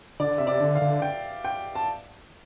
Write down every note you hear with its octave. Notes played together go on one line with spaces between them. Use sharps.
D3 D5
C3 E5
D5
D3
F5
D3
G5
G5
A5